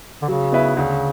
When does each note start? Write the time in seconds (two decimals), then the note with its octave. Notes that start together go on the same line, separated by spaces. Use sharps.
0.22 D3
0.28 C#3 F#3
0.52 B3 E4 B4 E5
0.76 D2 C#3